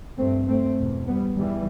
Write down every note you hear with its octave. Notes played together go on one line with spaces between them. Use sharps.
G2 A3 C4
A3 C4
E2 B2
G3 B3
E2 E3 G3